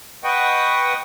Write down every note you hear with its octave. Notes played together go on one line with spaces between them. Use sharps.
B4 D#5 F#5 G5 C#6 D#6